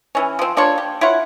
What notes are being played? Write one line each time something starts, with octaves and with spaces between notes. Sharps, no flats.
E3 C#4
F3 C4
A#3 D4 F4 C#5
G4
E4 F4 C#5 F#5